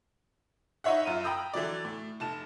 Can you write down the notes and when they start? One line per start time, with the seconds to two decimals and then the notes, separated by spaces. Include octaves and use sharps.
0.84 D#4 E4 C#5 E5 F#5
1.05 F#2 F4 D#7
1.24 G5 A#5 B5 D#6 E6 G6
1.54 D3 E3 F#3 D5
1.85 A2
2.20 F1 A5 E7